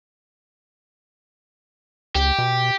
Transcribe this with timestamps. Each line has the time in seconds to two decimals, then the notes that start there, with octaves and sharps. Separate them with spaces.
2.15 C#2 G4
2.39 B2